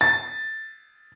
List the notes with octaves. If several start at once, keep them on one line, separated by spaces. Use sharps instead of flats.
A6